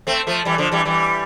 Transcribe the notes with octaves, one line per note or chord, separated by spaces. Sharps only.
A3 C4
F3 A3
E3 G3
D3 F3
E3 G3
E3 G3